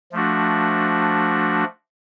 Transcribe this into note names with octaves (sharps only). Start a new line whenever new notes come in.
F3 A3 D4 F#4